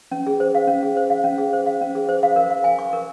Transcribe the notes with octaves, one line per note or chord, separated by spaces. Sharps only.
C#4
G#4
C5
F5
C#4
G#4
C5
F5
C#4
G#4
C5
F5
C#4
G#4
C5
F5
A#4
F5
G#5
C#6
A#4